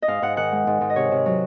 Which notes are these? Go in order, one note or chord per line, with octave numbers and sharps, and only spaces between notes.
D#5
G#2 F5
G#2 F#5
D#3 F#5
G#3
G#2
G#2
D#5
C3 C#5
C3
F#3